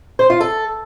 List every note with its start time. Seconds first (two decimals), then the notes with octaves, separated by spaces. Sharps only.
0.19 C5
0.30 F4
0.41 A4